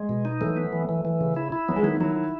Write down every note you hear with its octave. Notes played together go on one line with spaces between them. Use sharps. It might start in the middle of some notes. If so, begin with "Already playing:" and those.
Already playing: G#3
B2
D#4
E3 F#3 A3
B3
E3
E3
E3
C#3
E4
E4
F#3 B3
G#3
D#3 F#3 E4
D#3 F#3 E4
E4